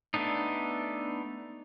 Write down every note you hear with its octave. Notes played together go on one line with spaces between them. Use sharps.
A3 B3 D4 D#4